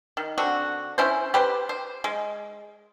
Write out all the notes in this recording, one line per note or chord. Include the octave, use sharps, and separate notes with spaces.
D#3
D3 C4 F#4
C#4 E4 C5
G4 B4 C5
C5
G#3